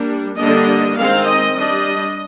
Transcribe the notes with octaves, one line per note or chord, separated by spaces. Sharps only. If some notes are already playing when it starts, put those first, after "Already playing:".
Already playing: G3 A#3 D4
D3 G3 A#3 D4 D#5
D#3 G#3 C4 F5
D#5
G3 D4 D#5